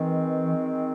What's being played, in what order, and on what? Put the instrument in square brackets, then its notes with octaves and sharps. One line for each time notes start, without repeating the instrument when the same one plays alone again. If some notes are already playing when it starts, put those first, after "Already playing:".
Already playing: [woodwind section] D#3 G#3 C4 [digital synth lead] E3